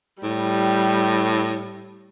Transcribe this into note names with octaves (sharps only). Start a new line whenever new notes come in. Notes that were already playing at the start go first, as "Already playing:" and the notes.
A2 G3